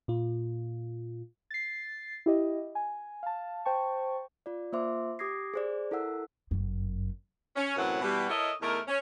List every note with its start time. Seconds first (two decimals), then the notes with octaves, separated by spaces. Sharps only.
0.08 A#2 F4
1.51 A6 C7
2.26 E4 G4 D#5
2.75 G#5
3.23 F5 A5
3.65 C5 G5 A5 C#6
4.46 F4 D5
4.73 A#3 F4 C5 E5 C6 D6
5.19 G4 D6 D#6 G#6 A#6 C7
5.54 G#4 C5 D5
5.91 E4 A4 A#4 F#5 E6
6.51 G1 F#2
7.56 C#4
7.77 F#2 A2 E3 F#3 C4 F#5
8.02 B2 E3 G3
8.30 E4 A4 A#4 C#5 D#5
8.62 E2 A3 D#4 A#4
8.87 C#4